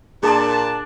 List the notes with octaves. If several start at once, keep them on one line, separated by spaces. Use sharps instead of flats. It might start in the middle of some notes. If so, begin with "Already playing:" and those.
A#2 D4 G#4 D5 A5